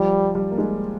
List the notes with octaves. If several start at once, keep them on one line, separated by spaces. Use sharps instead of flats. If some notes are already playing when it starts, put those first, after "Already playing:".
Already playing: F3 G3
G3
A#3
G#3